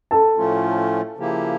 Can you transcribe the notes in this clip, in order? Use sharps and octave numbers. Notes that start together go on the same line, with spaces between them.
A4 A5
A2 F3 A3 C#4 F4
C#3 F3 A#3 E4 G4